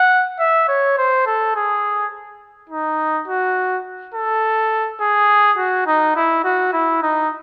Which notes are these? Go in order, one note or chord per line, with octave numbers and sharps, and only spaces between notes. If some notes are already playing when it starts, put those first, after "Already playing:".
Already playing: F#5
E5
C#5
C5
A4
G#4
D#4
F#4
A4
G#4
F#4
D#4
E4
F#4
E4
D#4